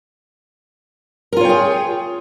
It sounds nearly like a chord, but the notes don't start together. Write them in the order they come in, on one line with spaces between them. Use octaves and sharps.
A#4 F4 C#5 G5 G#4